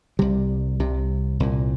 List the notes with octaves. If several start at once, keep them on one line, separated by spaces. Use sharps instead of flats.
C2 C3 G3
C2 C3
C2 A#2